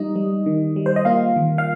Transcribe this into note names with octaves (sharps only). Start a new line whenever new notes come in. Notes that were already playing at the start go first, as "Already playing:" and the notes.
Already playing: G3 D#4 D#5
G3
D#3
G3
C5
D#5
A#3 F4 F5
D#3
F5